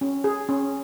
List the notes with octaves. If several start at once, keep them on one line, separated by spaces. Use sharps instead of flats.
C#4
G#4
C#4